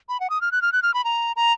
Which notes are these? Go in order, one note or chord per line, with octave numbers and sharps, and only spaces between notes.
B5
F#5
D#6
F6
F#6
F6
F#6
F6
B5
A#5
A#5